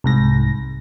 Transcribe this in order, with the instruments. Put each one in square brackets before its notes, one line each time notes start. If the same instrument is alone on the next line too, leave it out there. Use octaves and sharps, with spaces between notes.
[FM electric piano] C2 G#2 A#6